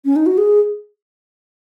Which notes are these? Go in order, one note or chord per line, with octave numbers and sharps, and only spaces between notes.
C#4
D#4
F#4
G#4